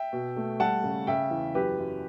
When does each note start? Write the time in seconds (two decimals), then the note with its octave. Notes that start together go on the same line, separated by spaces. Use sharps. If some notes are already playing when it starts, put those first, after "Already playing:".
Already playing: E5 G5
0.13 B2
0.36 A3
0.60 G3 F#5 A5
0.84 C#3
1.07 C#3 E5 G5
1.31 E2
1.55 F#2 G4 B4
1.78 F#2